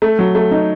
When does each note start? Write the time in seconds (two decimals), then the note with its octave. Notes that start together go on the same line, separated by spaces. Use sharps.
0.02 A3
0.19 F#3
0.35 A3
0.51 D#4